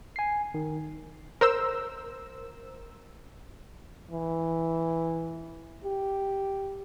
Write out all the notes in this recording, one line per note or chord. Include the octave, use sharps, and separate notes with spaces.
G#5 C7
D#3
A#4 C5 E6
E3
G4